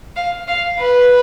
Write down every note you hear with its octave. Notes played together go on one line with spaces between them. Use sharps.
F5
F5
B4